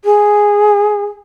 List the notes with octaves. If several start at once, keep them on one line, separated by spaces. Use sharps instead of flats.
G#4